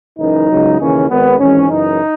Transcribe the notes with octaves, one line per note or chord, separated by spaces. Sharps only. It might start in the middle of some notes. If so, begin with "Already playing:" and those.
F#1 F#2 E3 D#4
C#2 C#3 F#3
D#2 C#3 E3 C#4
G#1 G#2 D#3 B3
G#1 G#2 E3 C#4
F#1 F#2 E3 D#4